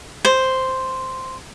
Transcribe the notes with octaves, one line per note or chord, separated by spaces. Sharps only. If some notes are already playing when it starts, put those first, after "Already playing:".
C5